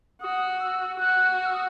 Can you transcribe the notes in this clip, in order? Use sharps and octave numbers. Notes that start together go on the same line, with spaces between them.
F#4 D#6
E6
F#4 F#6
F#6
E6
D#6